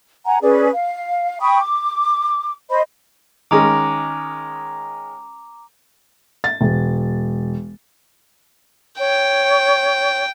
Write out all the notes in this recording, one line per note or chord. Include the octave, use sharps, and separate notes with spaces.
F#5 G#5 A#5
C#4 G#4 B4 D5
F5
G5 B5 C#6 D#6
D6
C5 D#5 B5
D#3 G#3 C#4 A#5 D6
A6
E1
C#5 G5